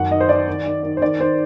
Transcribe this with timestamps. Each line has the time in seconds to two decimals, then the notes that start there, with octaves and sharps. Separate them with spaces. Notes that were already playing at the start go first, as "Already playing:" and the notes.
Already playing: F#2 D#3 F#5
0.11 D#3 D#5
0.20 C5
0.29 D#3 D5
0.48 D#3
0.66 D#3
0.83 D#3
0.97 C5
1.02 D#3 D5
1.19 D#3 C5